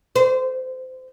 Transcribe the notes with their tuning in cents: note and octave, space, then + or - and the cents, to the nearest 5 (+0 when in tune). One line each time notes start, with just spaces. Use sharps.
C5 -25